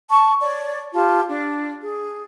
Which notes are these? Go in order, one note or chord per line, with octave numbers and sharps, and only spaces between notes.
A5 C#6
C#5 D5
F4 G4 A5
D4
G#4